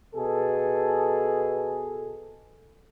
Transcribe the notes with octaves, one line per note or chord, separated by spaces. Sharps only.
B2 G#4 A4